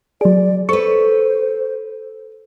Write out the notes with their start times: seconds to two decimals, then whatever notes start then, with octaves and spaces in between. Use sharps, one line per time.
0.21 F#3 G#4 D5
0.69 A4 B4 C5 C#6